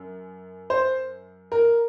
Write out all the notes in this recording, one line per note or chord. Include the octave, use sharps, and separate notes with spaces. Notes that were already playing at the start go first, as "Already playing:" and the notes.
Already playing: F#2
C5
A#4